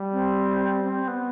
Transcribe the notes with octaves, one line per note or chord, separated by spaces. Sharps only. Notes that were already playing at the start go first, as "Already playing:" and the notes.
Already playing: G3
C4
C4
B3